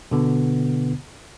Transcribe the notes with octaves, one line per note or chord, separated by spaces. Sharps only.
B2 D3 B3